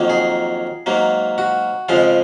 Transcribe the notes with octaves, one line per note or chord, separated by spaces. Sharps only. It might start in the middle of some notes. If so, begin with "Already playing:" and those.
Already playing: F2 D#3 F#3 A#3
G#4
G#2 F#3 A#3
F#4
F2 C#3 F3 G#3 F4